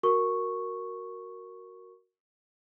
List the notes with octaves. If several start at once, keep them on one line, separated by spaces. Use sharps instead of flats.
F#4 A#4 C#6